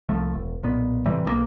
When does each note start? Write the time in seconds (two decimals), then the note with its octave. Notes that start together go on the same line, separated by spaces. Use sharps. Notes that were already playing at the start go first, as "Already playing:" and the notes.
0.09 C2 F3 A3
0.34 E1
0.63 B1 A#2 B3
1.06 A2 C3 E3 G3
1.25 B1 E3 A#3